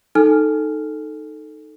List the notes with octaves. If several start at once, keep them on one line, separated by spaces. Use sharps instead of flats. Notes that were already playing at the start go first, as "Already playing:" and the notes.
D#4 A4 G#5 F6